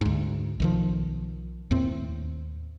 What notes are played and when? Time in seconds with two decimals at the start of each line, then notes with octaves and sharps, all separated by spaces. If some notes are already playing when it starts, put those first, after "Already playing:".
0.01 D2 G#2
0.60 B1 D#3 F3
1.71 D#2 A2 C4